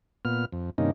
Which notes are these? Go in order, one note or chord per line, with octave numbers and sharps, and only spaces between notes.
A#2 B3 F6
F2
G2 C3 D#3 A#3 C#4 D#4